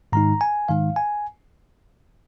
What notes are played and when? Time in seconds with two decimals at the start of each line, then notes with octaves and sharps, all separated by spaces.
0.12 G#2 D#3 G#3 D#4 A#5
0.41 G#5
0.69 G#2 D#3 G#3 D#4 F5
0.96 G#5